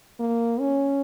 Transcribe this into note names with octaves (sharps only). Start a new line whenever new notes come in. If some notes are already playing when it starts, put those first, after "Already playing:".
A#3
C#4